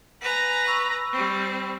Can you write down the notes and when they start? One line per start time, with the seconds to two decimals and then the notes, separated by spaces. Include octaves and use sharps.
0.22 B4 F#5 G#5 A#5
0.66 B5 C#6 E6
1.13 G3 C4